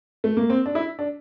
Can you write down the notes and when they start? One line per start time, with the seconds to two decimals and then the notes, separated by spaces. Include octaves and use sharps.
0.24 A3
0.37 A#3
0.50 C4
0.66 D4
0.75 E4
0.99 D4